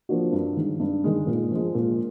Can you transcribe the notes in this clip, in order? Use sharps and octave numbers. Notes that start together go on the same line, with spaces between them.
F3 A#3 D4 F#4
G2
D#3 G#3
G2
D#3 G#3
A#2
F3 G#3
A#2